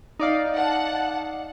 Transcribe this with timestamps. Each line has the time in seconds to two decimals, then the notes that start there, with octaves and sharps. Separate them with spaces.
0.20 D#4 D5 F5
0.56 F#5 A5